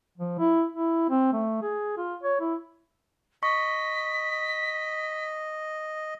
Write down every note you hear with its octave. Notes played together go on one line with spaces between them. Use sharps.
F3
E4
E4
C4
A3
G#4
F4
C#5
E4
D#5 C#6 B6